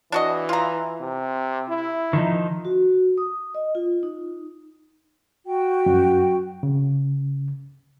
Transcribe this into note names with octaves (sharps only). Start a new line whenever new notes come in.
E3 D4 F#4 D#5
F4 A#5
C3
E4
D#3 F3 D#4
F#4
D#6
D#5
F4
D#4
F#4 G5
F#2
C#3